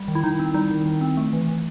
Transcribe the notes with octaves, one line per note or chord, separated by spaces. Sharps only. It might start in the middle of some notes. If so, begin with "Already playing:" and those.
Already playing: G3
D#3
E4
D#3 D#4
C4
G3 D#4
D#3
D#3
C4
A3
E3
E3